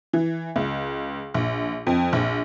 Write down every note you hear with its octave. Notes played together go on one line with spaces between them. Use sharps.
E3
C#2
A#1
F2
A#1